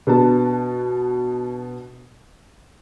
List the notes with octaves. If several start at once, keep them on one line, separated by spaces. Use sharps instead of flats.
B2 B3 D4 A5